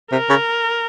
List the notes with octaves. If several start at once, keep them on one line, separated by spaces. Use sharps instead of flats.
C3 A#4
C#3